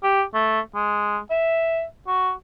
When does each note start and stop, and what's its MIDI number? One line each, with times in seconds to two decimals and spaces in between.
0.03 0.23 67
0.34 0.60 57
0.75 1.19 56
1.30 1.84 76
2.07 2.32 66